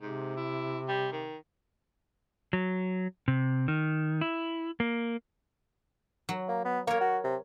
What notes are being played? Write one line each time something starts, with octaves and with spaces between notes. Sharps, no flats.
G#2 C3
E4
G3
D#3
F#3
C3
D#3
E4
A#3
F#3
A#3
B3
A#3 A#4 C#5
F#4
C3